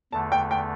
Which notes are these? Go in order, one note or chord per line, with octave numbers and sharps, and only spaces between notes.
E2 D3 A3 A5
G5
G5